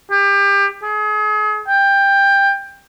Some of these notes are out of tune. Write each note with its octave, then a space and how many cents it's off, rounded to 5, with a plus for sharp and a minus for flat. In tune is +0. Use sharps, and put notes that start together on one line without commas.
G4 +25
G#4 +35
G5 +15